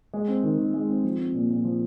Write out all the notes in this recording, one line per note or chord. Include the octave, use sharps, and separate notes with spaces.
G#3
C4
D#3
D#3
G#3
C4
F3
C4
A#2
A#2
F3